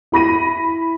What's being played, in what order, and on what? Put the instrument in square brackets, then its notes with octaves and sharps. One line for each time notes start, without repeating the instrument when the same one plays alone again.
[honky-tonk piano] E4 B5 A#6 D#7